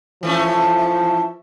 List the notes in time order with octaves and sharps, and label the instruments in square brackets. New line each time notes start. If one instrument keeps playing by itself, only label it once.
[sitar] E3 A3 C#4 [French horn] F3